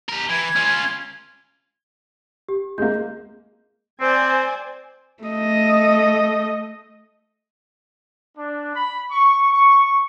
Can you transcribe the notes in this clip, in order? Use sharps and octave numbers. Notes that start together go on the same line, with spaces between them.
G4 A#4
E3 G#6
C#4 F4
G4
G#3 A#3 G6
C4 C5 D5 G#5
A3 D#5
D4
B5
C#6
C#6